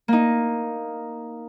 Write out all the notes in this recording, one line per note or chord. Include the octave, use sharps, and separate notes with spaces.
A#3 D#4